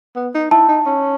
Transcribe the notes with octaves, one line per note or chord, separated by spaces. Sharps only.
B3
D#4
E4 A5
D#4
C#4